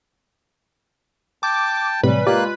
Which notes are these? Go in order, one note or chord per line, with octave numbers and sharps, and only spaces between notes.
G5 A5 D6
A2 C3 E3 F#3 G3 B4
G#3 A#3 F4 G4 D5 F#6